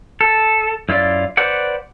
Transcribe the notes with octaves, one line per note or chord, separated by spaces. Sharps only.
A4
F#2 E4 F4 D5
B4 C5 D5 F#5